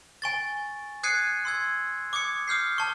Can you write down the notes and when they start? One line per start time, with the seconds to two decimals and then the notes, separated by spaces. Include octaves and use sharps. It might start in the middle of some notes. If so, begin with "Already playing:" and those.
0.22 G#5 C#6 A6
1.03 D#6 F#6 G#6 C7 C#7 D#7
1.45 C6 E6 G#6
2.13 D6 D#6 G#6 C#7
2.48 D#6 F6 G6 C7
2.78 A5 C#6